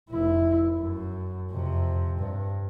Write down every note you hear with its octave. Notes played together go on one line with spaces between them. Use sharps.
F1 E4
F#2
F2 C3
G2